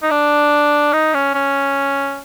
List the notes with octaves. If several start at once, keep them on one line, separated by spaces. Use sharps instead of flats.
D#4
D4
D#4
C#4
C#4